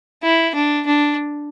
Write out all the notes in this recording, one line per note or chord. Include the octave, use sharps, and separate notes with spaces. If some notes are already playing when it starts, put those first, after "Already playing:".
E4
D4
D4